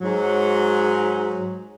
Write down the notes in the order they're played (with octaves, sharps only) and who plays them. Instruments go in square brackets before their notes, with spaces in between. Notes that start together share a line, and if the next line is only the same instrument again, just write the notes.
[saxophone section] G#2 F#3